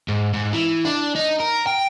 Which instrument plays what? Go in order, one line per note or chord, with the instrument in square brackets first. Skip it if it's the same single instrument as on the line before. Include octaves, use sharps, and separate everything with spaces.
[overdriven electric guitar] G#2
G#2
E3
D4
D#4
A#4
G5